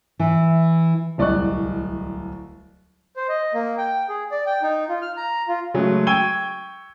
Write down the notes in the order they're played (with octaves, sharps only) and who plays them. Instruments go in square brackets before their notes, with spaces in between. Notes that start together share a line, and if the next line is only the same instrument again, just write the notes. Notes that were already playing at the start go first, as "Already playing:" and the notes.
[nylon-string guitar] E3
[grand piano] D1 C2 D5 D#5 C#6 F#6
[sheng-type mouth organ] C5
D#5
A#3
G5
G#4
D5
G5
D#4
F4
F6
A#5
F4
[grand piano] C#3 F#3 G#3 A3
G5 C#6 E6 G#6 D#7 G7